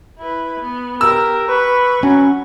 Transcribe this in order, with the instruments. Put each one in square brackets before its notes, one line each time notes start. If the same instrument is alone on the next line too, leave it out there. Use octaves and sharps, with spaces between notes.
[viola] E4 B4
B3
[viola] G4 [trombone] A#4 [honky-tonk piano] E6
[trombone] B4 [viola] B5 C#6
[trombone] F#3 [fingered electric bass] C#4